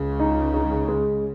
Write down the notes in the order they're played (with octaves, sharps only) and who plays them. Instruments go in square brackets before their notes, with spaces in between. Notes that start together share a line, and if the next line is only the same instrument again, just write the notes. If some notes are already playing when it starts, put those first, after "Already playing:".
Already playing: [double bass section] C#2 C#3
[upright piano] D#4
D#4
G#3